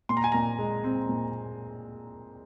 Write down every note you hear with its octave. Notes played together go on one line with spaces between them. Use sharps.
A#2 C6
A#5
G#5
A#2 A#5
G#3
C4
A#2